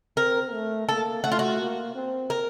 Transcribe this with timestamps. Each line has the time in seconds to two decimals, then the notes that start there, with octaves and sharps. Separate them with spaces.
0.17 C4 A#4
0.52 A3
0.88 A#3 A4
1.24 A3 F#4
1.32 F4
1.39 F#4
1.60 A#3
1.95 C4
2.30 A#4